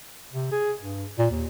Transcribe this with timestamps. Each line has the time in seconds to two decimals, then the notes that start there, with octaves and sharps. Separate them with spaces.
0.33 C3
0.52 G#4
0.81 G2
1.19 A#2
1.30 D#2